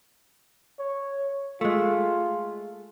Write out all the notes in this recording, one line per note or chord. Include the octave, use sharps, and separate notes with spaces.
C#5
G#3 A3 F4